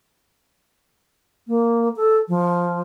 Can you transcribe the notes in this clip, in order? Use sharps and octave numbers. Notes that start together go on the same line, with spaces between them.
A#3
A4
F3